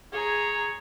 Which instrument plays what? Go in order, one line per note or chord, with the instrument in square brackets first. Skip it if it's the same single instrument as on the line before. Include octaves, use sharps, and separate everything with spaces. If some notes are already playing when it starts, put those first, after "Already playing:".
[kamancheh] G#4 A#5 [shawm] C#5